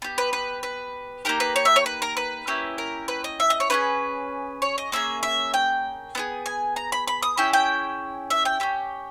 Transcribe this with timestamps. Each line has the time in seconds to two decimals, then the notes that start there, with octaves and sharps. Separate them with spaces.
0.02 B3 G4
0.18 B4
0.33 B4
0.63 B4
1.25 A#3 D#4 G4 A#4
1.40 B4
1.56 C#5
1.65 E5
1.76 C#5
1.86 B4
2.02 A#4
2.17 B4
2.47 A#3 C#4 E4 G4
2.78 A#4
3.08 B4
3.24 D#5
3.40 E5
3.50 D#5
3.60 C#5
3.70 C#4 E4 G#4 B4
4.62 C#5
4.78 D#5
4.92 A#3 C#4 G#4 E5
5.23 E5
5.54 G5
6.15 B3 E4 G#4
6.46 G#5
6.76 A#5
6.92 B5
7.08 B5
7.23 D#6
7.37 C#4 E4 G#4 G5
7.53 G5
8.30 E5
8.45 G5
8.60 C#4 E4 G4